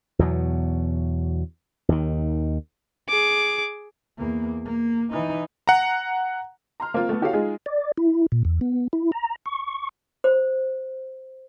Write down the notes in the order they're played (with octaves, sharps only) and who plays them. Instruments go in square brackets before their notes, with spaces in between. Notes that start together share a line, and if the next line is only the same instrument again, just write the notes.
[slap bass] E2 B2 F#3
D#2 D#3
[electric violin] G#4 D6
[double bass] E2 A#3
A#3
E3 D#4
[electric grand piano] F#5 A#5
[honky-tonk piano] A#5 C6 F6
A#3 C4 F4
A3 B3
E4 F#4 G4 A4 C#5 F5
G#3 D#4 F4 G#4
[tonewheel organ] D5
E4
A#2
E2
B3
E4
A#5
C#6
[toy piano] C5